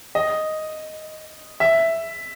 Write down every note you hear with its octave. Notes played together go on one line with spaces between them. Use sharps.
D#5
E5